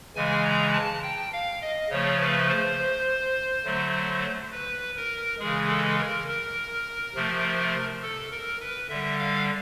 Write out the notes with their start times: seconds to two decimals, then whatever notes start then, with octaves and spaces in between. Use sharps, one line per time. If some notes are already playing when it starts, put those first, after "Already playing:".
0.16 C#3 E3 G#3 G#5
0.45 A#5
0.73 A5
1.03 G5
1.33 F5
1.62 D#5
1.90 C#3 F3 A3 C#5
2.20 B4
2.49 C5
3.65 D3 F#3 A3
4.52 B4
4.96 A#4
5.39 C#3 E3 G#3 G#4
5.69 A4
5.98 A#4
6.28 A#4
7.15 C3 F3 A3
8.02 A4
8.31 A#4
8.61 B4
8.89 D3 G3 E5
9.19 F5